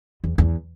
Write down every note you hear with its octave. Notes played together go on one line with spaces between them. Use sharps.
E2
E2